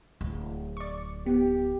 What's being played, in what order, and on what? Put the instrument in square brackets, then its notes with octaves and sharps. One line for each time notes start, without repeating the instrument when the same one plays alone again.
[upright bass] D1
[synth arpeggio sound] D5 C#6
[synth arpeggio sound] B3 [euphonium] G4